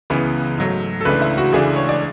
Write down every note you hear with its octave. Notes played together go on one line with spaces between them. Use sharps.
C#2 C#3 E3 B3
G#2 F#3 A3
A4
C#2 C#3 E3 A3 D4 B4
E4
F#4
C#2 C#3 E3 A3 D4 G#4
C#5
D5